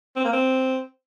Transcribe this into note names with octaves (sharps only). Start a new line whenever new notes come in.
C4
A#3
C4